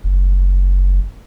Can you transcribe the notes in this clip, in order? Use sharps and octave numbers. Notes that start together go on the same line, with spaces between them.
F#1